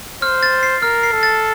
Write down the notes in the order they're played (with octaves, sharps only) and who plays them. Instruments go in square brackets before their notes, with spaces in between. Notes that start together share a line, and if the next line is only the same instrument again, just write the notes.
[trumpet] C5 [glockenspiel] F6
[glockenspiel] A6
C7
[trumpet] A#4 [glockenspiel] F6
[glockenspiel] C7
[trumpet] A4
[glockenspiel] A6